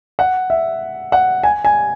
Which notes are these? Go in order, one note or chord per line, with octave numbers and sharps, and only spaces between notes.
F#5
E5
F#5
G#5
G#5